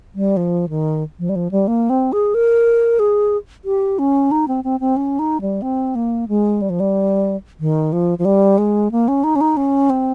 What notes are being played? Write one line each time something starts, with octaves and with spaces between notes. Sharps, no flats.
G3
F3
D#3
F3
G3
F3
G3
A#3
C4
G#4
A#4
G#4
G4
C#4
D#4
C4
C4
C4
C#4
D#4
G3
C4
A#3
G#3
G3
F3
G3
D#3
F3
F3
G3
G#3
A#3
C#4
D#4
C#4
D#4
C#4
C4